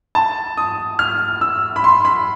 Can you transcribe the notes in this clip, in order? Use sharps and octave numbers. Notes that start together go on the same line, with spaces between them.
A5
D#6
F6
E6
B5
C6
B5